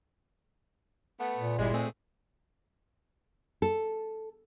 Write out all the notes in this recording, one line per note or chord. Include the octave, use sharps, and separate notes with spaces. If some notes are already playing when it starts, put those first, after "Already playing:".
A3 B3
A#2
G1 G3 G#3 E4
A3 C4 G#4
A4